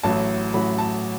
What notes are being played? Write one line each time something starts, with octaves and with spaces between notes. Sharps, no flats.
A1 A2 F#3 A5
A1 A2 F#3 B5
A5